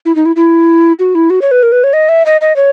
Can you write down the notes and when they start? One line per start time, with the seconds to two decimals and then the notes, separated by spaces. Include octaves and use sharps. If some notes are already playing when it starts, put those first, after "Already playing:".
0.05 E4
0.15 D#4
0.25 E4
0.36 E4
0.99 F#4
1.15 E4
1.30 F#4
1.42 C#5
1.51 B4
1.63 A#4
1.72 B4
1.84 C#5
1.93 D#5
2.09 E5
2.26 D#5
2.41 D#5
2.56 C#5